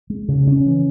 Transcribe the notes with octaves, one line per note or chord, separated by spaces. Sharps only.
G#3
C#3
C#4
E3